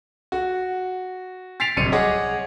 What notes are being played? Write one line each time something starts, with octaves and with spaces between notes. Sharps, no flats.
F#4
A6 B6 C7 D7 F7
D1 C2 C4 C#7 D#7
G#4 C#5 D#5 F#5 D6